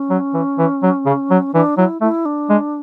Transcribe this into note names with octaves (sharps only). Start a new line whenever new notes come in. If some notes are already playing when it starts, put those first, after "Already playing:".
Already playing: C#4
F#3
E3
E3
F#3
C#3
F#3
E3 D4
F#3 E4
A3 E4
D4
G#3